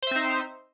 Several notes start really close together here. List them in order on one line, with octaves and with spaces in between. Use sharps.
C5 E5 C4 D#4